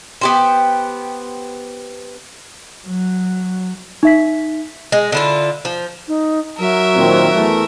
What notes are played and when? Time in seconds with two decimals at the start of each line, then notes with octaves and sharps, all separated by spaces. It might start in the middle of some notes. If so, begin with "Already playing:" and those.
0.21 B3 G4 C5
2.86 F#3
4.03 D#4 E5 B6
4.92 G#3
5.12 D3 E4 F4
5.65 F3
6.08 D#4
6.59 F#3 A#4 E5
6.96 A#2 D#3 C4
7.35 E2 E3 A3